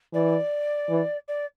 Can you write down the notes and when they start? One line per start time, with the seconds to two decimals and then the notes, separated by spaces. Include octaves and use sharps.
0.13 E3 D5
0.89 E3
1.28 D5